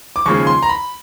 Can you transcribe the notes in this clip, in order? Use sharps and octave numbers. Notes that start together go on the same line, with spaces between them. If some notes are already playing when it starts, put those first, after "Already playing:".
D6
D#2 C#3 F3 G#3 C#6
C6
A#5
B5